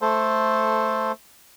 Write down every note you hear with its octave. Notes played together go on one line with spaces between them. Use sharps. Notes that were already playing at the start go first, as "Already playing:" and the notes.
A3 A4 C5